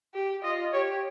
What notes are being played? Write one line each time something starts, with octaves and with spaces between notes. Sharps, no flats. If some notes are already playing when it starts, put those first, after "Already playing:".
G4
F4 D#5
G4 C#5